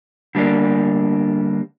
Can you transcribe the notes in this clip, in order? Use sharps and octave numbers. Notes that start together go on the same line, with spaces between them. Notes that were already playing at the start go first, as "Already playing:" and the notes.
D3 G3 A#3 D4